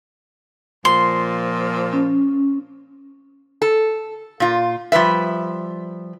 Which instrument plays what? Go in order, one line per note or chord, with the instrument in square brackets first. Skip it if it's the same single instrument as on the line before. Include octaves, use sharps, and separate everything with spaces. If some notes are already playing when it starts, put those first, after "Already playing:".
[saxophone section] A#2 F3 [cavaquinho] C6
[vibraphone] C#4
[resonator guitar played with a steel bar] A4
A#2 F4
F3 G3 B4 E5